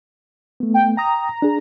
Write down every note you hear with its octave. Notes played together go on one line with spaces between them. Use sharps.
A3 B3
G5
G5 A#5 D#6
D4 G#4